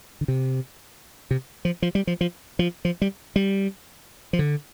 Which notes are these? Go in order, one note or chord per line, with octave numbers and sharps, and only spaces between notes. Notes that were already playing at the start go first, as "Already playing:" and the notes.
D3
C3
C3
F3
F3
G3
F3
F3
F3
F3
G3
G3
F3
D3